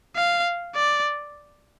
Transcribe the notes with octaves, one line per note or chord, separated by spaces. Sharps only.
F5
D5